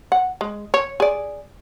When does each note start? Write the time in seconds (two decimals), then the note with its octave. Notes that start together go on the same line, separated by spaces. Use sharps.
0.12 F#5
0.41 G#3
0.74 C#5
1.00 G#4 D5